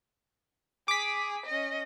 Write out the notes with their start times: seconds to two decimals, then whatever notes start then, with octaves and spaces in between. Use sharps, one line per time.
0.88 G#4 D6 B6
1.46 C#4 D#5